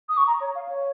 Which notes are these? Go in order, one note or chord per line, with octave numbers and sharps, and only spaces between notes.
D#6
C#6
A#5
C#5
F5
C#5